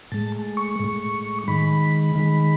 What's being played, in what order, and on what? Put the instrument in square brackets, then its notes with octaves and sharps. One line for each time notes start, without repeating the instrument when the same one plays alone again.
[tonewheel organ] A2 G#3 A5
C#6
A2 G#3
D#3 G#3 B5
D#3 G#3